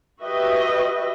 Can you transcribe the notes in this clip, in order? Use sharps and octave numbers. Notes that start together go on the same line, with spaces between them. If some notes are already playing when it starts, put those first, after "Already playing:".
F#4 G4 B4 D#5 E5